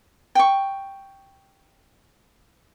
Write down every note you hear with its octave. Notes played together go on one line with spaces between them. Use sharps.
G5 C#6